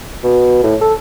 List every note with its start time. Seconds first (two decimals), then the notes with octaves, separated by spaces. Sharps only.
0.24 B2
0.63 A2
0.81 A4